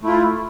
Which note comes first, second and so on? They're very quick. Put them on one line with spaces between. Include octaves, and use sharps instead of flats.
A3 E4 F4